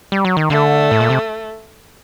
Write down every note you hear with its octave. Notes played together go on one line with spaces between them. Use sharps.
G3
F#3
D#3
D3 A3
A2
A#2
C3